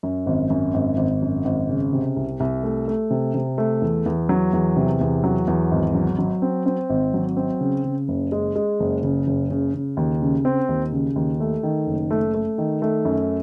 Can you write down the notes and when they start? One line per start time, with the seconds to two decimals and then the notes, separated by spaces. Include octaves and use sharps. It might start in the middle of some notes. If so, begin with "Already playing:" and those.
0.03 F#2
0.27 G#1
0.50 F#2
0.74 G#1
0.97 G#1
1.22 F#2
1.45 G#1
1.69 C#3
1.93 C3
2.16 C2
2.40 C2
2.64 A3
2.88 A3
3.10 C3
3.34 C3
3.58 A3
3.82 E2
4.06 E2
4.29 F#3
4.53 E2
4.77 C3
5.01 E2
5.24 F#3
5.48 E2
5.72 G#1
5.95 F#3
6.19 F#3
6.42 C4
6.66 C4
6.90 G#1
7.14 F#3
7.37 C4
7.60 C#3
7.84 C#3
8.08 F#1
8.32 G#3
8.56 G#3
8.80 F#1
9.03 C#3
9.27 F#1
9.51 C#3
9.74 C#3
9.97 D#2
10.21 C#3
10.45 C4
10.69 D#2
10.92 C#3
11.16 D#2
11.40 A3
11.63 D#3
11.87 F#1
12.11 A3
12.34 A3
12.58 D#3
12.82 A3
13.05 F#2